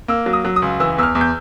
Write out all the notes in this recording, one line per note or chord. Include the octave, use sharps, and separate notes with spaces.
A#3 E6
F#3
D#6
F#3
D#6
C#2
E3 E6
E2 E6 F6
E2
G6